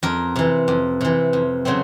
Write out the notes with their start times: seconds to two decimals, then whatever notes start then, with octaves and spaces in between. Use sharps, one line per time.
0.03 F2 A#4
0.36 C3 E3
0.68 F2
1.01 C3 E3
1.33 F2
1.65 C#3 F#3 A3 C4